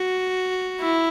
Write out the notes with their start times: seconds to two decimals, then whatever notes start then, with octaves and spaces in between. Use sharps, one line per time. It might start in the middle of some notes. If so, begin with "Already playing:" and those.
Already playing: F#4
0.80 E4